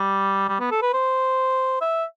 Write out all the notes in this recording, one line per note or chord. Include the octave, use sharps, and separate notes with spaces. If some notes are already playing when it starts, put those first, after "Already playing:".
Already playing: G3
G3
B3
A4
B4
C5
E5